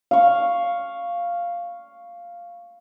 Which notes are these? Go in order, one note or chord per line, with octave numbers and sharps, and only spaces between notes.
F5 C#6